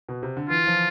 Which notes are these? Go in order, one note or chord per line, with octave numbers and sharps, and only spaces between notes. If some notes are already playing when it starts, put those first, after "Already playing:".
B2
C3
D3
E3 F4
F3